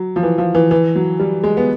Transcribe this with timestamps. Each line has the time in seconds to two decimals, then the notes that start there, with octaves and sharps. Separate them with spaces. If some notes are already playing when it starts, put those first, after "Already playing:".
Already playing: F#3
0.16 F3
0.23 E3
0.38 F3
0.55 E3
0.71 E3
0.96 F#3
1.20 G3
1.44 G#3
1.57 B3